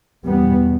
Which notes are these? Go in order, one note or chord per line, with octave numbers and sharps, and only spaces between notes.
E2 B2 G3 B3